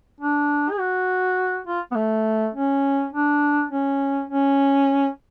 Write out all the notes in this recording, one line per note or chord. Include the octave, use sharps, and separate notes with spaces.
D4
G#4
F#4
F4
B3
A3
C#4
D4
C#4
C#4